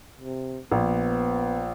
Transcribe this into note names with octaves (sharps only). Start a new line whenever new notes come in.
C3
A#1 B3